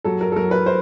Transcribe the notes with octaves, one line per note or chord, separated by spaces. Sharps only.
F#3 A4
A#4
A4
F#3 A#4
B4
C5